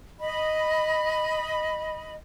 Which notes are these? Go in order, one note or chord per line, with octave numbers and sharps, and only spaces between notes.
D#5 B5